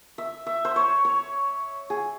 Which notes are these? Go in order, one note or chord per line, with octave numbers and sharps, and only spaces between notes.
E5
E5
C5
C#5
C#5
G#4